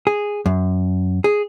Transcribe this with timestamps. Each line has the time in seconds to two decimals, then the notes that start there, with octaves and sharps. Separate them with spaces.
0.07 G#4
0.46 F#2
1.24 G#4